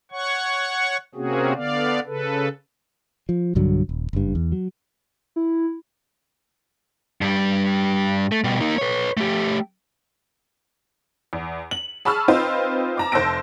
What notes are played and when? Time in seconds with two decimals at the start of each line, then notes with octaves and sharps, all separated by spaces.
0.12 C#5 F#5 C#6
1.15 C3 A#3 C4 C#4 F#4 G#4
1.54 D3 B3 D5 F5
2.06 C#3 A4 B4
3.29 F3
3.55 B1 G2 D3 F#3
3.89 D#1
4.13 F#1 G2
4.35 E2
4.52 F#3
5.36 E4
7.21 G2 G3
8.32 A3
8.44 B2 G3
8.60 A#3 D#4
8.78 B4 C#5
9.17 A3 G4
11.33 E2
11.71 F#7
12.05 G#4 A5 B5 C#6 E6 F6
12.28 C4 D#4 F4 B4 C5
12.98 A5 A#5 D6
13.12 F1 C5 A5 E6 A#6 D7